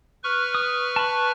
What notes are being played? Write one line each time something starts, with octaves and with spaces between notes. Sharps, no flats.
B4 C#6 F6
D#6
A5 B5